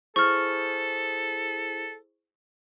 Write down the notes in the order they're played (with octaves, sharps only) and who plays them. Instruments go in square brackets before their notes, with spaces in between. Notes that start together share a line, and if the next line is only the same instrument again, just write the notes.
[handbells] E4 G#4 C5 [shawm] A4 [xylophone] C#6 F6